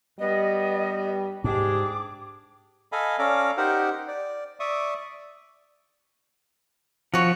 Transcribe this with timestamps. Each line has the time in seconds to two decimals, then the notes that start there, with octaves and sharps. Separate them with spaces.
0.19 G2 G3 B3 D#5
1.44 G#2 D4 G4 G#4 D6
2.92 A4 D#5 F5 G#5 B5
3.19 C#4 A4 D5 F5 A#5
3.57 D#4 G4 A#4 C5 F#5
4.08 D5
4.60 D5 E5 C#6 D#6
7.14 F3 F#4 C#5